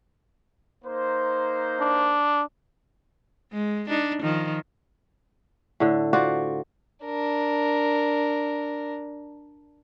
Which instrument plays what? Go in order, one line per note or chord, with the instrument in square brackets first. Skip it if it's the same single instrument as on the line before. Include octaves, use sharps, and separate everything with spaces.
[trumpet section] A#3 D#4 C5
[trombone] D4
[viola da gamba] G#3
D4 D#4
D#3 F3
[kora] A2 D3
F4 F#4 C5 D5
[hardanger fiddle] D4 A#4